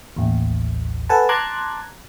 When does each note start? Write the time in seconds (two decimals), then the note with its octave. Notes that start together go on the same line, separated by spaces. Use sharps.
0.16 A1 D#2
1.09 A4 B4 F#5 G#5 A5
1.29 A5 A#5 C6 D6 F#6 G#6